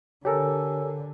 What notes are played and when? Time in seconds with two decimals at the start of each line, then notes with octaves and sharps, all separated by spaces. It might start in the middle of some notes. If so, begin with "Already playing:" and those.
0.25 D3 G4 A4 A#4 C#5 G#5 E6